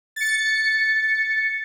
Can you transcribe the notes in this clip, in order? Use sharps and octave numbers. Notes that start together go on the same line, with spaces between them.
A6 C#7